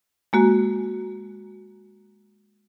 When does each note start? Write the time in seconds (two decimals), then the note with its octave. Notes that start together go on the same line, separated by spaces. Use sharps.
0.33 G#3 A#3 F#4